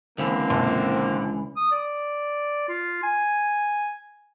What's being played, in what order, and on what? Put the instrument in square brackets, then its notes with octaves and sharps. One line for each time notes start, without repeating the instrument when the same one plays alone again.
[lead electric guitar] C#2 E3 [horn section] D3 A#3 C4
[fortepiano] A#1
[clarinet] D#6
D5
F4
G#5